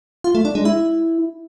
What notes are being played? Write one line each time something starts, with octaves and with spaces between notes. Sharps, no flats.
F4
A3
D4
G#3
E4